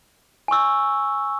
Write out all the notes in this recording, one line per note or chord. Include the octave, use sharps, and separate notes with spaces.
G#5 C#6 E6